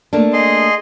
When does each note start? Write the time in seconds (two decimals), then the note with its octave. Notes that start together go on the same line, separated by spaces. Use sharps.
0.13 A3 A#3 D4
0.33 G#4 D#5 C6